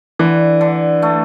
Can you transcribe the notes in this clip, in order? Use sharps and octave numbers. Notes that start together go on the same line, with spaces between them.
D3 E3
D3
A3